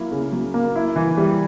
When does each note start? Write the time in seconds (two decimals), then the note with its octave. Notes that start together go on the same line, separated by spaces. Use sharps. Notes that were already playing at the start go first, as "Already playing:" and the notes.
Already playing: F#3 A#3 E4
0.11 C#3
0.32 F#3
0.54 A#3
0.76 E4
0.96 E3
1.17 G3